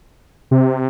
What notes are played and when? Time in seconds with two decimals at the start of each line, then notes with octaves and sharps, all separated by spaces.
0.51 C3